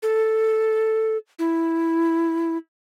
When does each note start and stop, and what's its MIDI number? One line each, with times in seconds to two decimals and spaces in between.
0.03 1.17 69
1.39 2.57 64